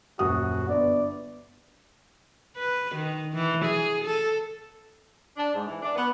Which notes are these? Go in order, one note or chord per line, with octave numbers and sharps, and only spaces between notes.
D#1 F#2 F#4 D#6
G1 B3 D4 D5
B4
D#3
E3
G#4
A4
D4
G#2
E3
D4
B3